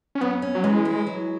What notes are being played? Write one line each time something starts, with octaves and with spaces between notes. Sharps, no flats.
C#4
F#2 B3
C#4
F#3
E3 G#3
E4
F#3